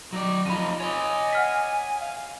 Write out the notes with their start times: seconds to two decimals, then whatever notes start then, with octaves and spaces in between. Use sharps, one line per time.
0.13 F#3 D#4 D5
0.46 F2 D#4 F4 B5 D#7
0.80 C#5 D#5 G#5
1.33 F#5 F6 B6
2.00 F5